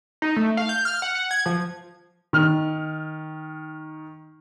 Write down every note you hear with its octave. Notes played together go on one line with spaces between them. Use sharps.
D#4
A3
F5
G6
F6
F#5
F#5
G#6
F3
D#3 F6